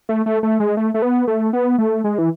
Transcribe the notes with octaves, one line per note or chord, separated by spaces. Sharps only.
A3
A3
A3
G#3
A3
A3
B3
A3
B3
A3
G#3
E3